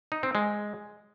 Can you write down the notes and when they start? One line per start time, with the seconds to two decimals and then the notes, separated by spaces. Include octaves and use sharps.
0.12 D#4
0.23 C4
0.35 G#3